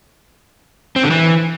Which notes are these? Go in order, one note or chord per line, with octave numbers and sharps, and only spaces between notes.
C4
D3
E3